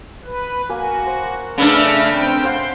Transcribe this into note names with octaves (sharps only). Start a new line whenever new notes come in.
B4
A#3 F#4 G#5
C5
C#3 A3 D4 B4 D5 E6 F6
C4 G5
C5 F5 F#5 C6